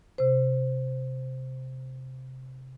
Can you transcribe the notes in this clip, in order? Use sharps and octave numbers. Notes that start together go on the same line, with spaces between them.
C3 C5